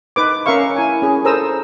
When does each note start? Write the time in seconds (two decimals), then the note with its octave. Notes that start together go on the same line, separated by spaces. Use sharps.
0.16 D#4 B4 D6
0.46 C#4 A#4 E5 F5 C#6
0.76 E4 G#5
1.02 C#4 G#4
1.25 A4 A#4 C5 A#5 D#6 E6